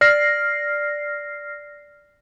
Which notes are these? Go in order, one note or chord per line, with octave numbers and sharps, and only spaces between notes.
D5 F6 A#6 C7